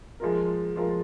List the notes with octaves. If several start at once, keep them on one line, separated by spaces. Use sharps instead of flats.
F3 G#3 F4 A#4
F3 G#3 F4 A#4